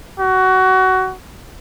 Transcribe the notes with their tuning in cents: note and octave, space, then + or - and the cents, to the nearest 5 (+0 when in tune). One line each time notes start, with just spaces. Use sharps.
F#4 +20